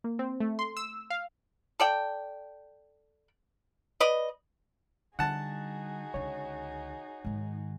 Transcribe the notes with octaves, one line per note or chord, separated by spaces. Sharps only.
A#3
C4
A3
C6
E6
F5
A4 D5 G5
B4 D5 D#5
D3 G3 D#4 F#4 G#4 F#5 A5
C#2 D3 C#5
G#2 D#3